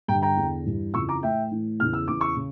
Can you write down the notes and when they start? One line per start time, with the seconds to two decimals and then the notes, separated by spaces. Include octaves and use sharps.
0.08 G2 G5 A#5
0.12 D3
0.22 G5 A#5
0.37 E2 D3
0.66 G2 E3
0.94 F2 C#3 E3 C#6 E6
1.09 A#5 D6
1.23 A2 E3 E5 G5
1.51 A2 E3
1.79 E2 C#3 E3 F6
1.93 E6
2.08 E2 C#3 E3 D6
2.21 C#6 E6
2.36 C#3